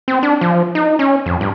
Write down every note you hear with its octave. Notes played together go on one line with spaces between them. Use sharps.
C4
D4
F3
D#4
C#4
F2
G2